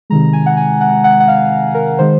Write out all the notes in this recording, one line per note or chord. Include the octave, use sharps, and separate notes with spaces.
C3 D#3 G#3 A#5
G#5
F#5
G#5
F#5
F#5
F#5
F5
A#4
D#3 G#3 C5